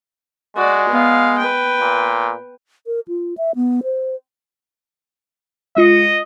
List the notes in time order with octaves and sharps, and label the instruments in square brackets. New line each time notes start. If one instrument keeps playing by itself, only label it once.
[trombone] G#3 [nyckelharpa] F#4 D5
[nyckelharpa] B3 F5
B4 G5
[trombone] A#2
[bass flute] A#4
F4
E5
B3
C5
[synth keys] G#3 F4 C#7 [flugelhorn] D#5